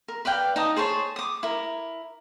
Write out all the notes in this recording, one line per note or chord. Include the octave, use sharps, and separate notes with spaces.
A#4
B4 D5 F5 G5
D#4 A5 D#6
G#4 C5 C#5 A5
D6 D#6
E4 A#4